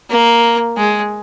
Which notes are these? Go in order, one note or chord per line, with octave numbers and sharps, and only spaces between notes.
A#3
G#3